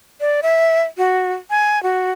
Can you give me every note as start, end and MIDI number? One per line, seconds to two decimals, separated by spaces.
0.21 0.41 74
0.43 0.83 76
0.98 1.33 66
1.50 1.82 80
1.83 2.11 66